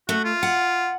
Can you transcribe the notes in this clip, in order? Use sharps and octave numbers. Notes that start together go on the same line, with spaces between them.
A3 F#4
F4
F#5